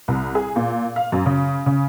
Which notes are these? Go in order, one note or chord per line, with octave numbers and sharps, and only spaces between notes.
C2
G#4
A#2
F5
F#2
C#3
C#3